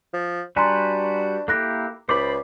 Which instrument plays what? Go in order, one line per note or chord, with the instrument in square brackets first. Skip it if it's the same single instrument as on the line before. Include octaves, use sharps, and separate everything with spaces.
[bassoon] F3
[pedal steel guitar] G3 F#4 B4 [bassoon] D4 [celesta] G#5 A#5 C6
[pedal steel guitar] A#3 E4 G4 [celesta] A4 F#6 A#6
[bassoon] C#2 [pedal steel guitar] C5 D5 B5 [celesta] D6